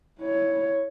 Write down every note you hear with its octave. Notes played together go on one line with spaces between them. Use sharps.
E4 C#5